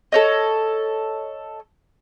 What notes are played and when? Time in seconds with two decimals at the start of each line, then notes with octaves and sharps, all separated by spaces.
0.12 A4 C#5 D#5